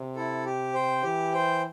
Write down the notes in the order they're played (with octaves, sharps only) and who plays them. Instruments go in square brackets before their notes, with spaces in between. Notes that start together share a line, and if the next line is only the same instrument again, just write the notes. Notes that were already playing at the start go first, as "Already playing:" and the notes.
Already playing: [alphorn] C3
[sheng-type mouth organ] E4 A4
G4
C5 G5
[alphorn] E3 [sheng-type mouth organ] G4
[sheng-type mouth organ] C5 G5